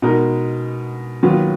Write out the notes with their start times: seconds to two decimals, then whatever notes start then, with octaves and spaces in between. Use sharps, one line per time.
0.02 B2 G#3 D#4 A#4
1.23 D#2 D#3 F#3 B3 F4